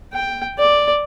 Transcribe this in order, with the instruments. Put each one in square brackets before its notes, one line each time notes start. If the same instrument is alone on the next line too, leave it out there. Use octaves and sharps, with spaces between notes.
[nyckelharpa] G5
D5